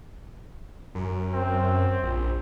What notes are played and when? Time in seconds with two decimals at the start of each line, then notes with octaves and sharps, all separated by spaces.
0.95 F#2
1.34 C4
2.03 A#1